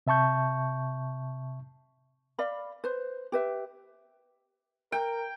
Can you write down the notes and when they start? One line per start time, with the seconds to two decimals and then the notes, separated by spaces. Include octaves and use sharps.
0.07 C3 E5 A5 C#6 G6
2.39 D5 F5 B5
2.84 B4 C5
3.32 G4 B4 E5
4.92 A#4 G5